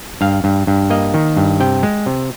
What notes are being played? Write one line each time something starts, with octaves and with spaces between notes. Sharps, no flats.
G2 F5
G2
G2
A#3 D#5
D#3
G2
C3 G5
G#3
C3